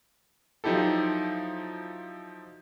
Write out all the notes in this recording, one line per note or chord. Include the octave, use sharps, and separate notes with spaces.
F3 F#3 D#4 E4 G4 A4